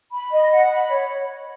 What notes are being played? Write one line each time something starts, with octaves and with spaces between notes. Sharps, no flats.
B5
D#5
F#5
B5
C#5